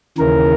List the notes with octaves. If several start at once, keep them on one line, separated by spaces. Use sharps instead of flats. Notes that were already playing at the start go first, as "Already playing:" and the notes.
D#2 C#3 E3 A#4